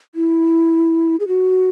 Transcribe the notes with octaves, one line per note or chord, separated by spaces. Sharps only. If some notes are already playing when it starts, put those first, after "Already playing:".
E4
G#4
F#4